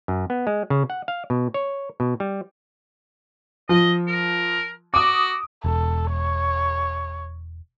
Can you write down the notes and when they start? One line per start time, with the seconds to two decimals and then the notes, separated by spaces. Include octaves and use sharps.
0.08 F#2
0.30 B3
0.47 G#3
0.70 C#3
0.90 F#5
1.08 F5
1.30 B2
1.54 C#5
2.00 B2
2.20 G3
3.69 F3 D#5
4.07 A#4
4.94 F#4 D6 D#6
5.64 E1 A4
6.12 C#5